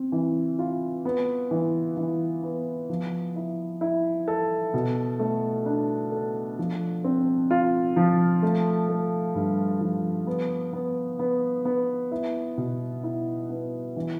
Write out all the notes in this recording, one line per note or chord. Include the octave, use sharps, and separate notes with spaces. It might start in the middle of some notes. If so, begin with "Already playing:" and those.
Already playing: C4
E3
F4
B3
E3
E3
B3
F3
E4
E4
A4
B2
A3
D4
A4
F3
C4
F4
F3
A3
A3
G2
F3
B3
B3
B3
B3
E4
B2
E4
B3
E3